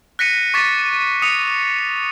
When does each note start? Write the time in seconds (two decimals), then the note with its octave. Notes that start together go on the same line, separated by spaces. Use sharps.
0.19 F#6 A#6 B6 C#7 D#7
0.54 C#6 D6 A6 B6
1.22 D#6 C#7 D#7 F7